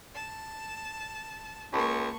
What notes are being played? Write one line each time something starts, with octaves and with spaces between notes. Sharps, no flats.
A5
C#2 A#3 A#4 A5 B5 C#6